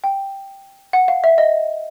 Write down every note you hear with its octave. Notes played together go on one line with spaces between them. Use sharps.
G5
F#5
F5
E5
D#5